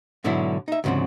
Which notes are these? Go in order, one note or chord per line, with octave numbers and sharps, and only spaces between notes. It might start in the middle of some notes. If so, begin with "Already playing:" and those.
G#2 B2 D3 F#3 B3 E4
D#4 E5
D2 G#2 C#3 F3 C4